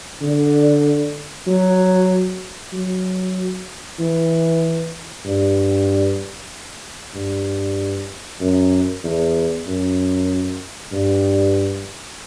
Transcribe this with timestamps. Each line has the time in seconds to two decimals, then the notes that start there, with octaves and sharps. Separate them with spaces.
0.21 D3
1.47 F#3
2.73 F#3
3.99 E3
5.26 G2
7.15 G2
8.41 F#2
9.04 E2
9.67 F#2
10.93 G2